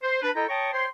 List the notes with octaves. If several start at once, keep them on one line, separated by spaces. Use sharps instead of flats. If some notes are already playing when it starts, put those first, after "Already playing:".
C5
D4 B4
E4 A4 D#5 G5 A#5
C#5 G5 A5 A#5 C#6 D#6
C5 C#5 G5 C6